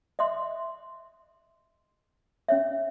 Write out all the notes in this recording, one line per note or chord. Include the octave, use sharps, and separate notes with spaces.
D#5 E5 C6
C#4 C#5 E5